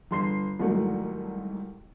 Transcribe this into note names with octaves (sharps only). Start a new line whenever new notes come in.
G1 C6 C7
C2 G#2 D#3 F#3 A3